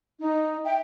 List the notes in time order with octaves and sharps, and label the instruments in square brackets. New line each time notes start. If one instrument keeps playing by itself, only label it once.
[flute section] D#4
E5 G5